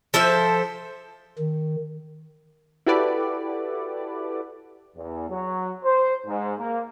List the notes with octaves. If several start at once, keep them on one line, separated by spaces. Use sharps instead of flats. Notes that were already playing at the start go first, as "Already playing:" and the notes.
F3 A4 C5 E5
D#3
E4 F#4 G4 A4 B4 D5
E2
F#3
C5
G#2
A#3